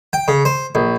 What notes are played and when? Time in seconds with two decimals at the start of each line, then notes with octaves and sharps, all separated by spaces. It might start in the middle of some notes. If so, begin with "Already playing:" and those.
0.13 G5
0.28 C#3
0.45 C5
0.75 A#1